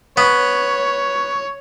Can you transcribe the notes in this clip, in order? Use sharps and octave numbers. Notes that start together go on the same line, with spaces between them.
B3 C#5